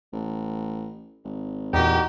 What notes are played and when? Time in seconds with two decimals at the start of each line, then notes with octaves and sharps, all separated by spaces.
0.13 A1
1.24 G#1
1.73 E2 A#2 D#4 F#4 G4